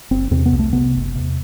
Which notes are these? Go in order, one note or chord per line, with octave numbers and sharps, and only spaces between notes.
F#1 C4
E2 C3 C4
B3
C2
A3
C3 B3
F#1
E2 C3